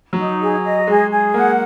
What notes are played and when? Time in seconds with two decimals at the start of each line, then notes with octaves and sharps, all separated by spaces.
0.13 F#3 D#4
0.41 G#4
0.64 D#5
0.87 G#3 G#4
1.10 G#4
1.34 A#3 F#5